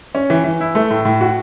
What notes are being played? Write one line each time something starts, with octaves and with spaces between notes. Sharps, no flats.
C#4
E3
E3
E4
A3
A2
A2
F#4